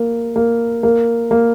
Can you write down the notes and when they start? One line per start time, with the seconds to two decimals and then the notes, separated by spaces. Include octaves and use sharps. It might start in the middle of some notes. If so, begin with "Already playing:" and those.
Already playing: A#3
0.36 A#3
0.83 A#3
1.31 A#3